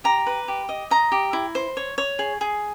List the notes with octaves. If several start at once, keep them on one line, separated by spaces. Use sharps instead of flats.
G4 A#5
B4
G4
D#5
D#5 A#5
G4
E4
C5
C#5
C#5
G#4
G#4